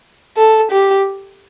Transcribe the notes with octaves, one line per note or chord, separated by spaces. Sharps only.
A4
G4